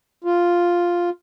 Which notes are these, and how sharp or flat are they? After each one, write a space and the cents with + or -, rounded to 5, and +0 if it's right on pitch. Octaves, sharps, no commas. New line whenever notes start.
F4 +0